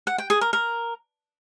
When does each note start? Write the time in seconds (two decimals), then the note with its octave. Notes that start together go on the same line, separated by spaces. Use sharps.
0.07 F#5
0.18 G5
0.30 G#4
0.41 A#4
0.53 A#4